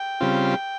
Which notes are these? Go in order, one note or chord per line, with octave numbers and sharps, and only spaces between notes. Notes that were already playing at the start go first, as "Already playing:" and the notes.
Already playing: G5
C#3 G3 C4 F4